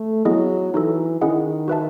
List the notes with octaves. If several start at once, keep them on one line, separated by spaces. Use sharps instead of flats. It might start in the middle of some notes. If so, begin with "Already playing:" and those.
Already playing: A3
F#3 B3 E4 G#4 D#5
E3 D#4 F#4 A4
D#3 C#4 E4 G#4 D#5 F#5
F#4 B4 E5 A5